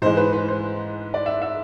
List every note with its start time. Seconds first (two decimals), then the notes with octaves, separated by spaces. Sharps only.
0.02 G#2 E3 G#3 C5
0.17 B4
0.33 B4
0.48 C5
1.14 D5
1.26 E5
1.42 E5